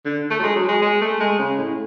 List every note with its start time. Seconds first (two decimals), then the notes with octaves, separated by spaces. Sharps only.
0.05 D3
0.30 A3
0.39 F#3
0.43 G#3
0.56 F#3
0.68 G#3
0.82 G#3
1.01 A3
1.20 G#3
1.39 C#3
1.58 A2